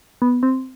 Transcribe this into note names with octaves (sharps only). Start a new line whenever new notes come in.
B3
C4